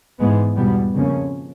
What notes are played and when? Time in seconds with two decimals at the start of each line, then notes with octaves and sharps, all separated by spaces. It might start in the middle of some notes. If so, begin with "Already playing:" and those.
0.20 G#2 E3 G#3 B3
0.56 E2 B2 G3 B3
0.94 F2 C#3 F3 A#3 C#4